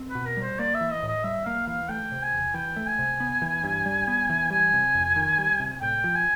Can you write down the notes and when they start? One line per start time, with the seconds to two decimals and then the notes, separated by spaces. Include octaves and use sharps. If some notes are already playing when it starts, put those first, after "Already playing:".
Already playing: C4
0.10 B4
0.15 B2
0.25 A#4
0.37 G3
0.42 C5
0.59 A#3 D5
0.74 E5
0.81 E3
0.91 D#5
1.03 A2
1.08 D#5
1.23 G3 E5
1.45 A#3 F5
1.67 E3 F5
1.89 A3 G5
2.12 C3
2.23 G#5
2.34 E2
2.54 E3 G5
2.76 A3
2.87 G#5
2.99 C3
3.20 B3
3.42 E3
3.64 G2
3.86 G3
4.08 B3
4.30 E3
4.50 G3 G#5
4.73 C3
4.95 F2
5.16 D#3
5.38 G3
5.60 C3
5.81 A2 G5
6.04 F3
6.15 G#5